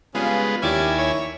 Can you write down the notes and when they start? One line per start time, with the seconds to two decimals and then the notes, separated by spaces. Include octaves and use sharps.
0.15 G2 C#3 G#3 B3 F4
0.63 D#2 C#4 E4 G4 D5 G#5
0.98 C#5